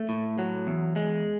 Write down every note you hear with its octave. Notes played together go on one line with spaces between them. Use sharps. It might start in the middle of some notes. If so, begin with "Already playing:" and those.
Already playing: A3
A2
F#3
E2
G#3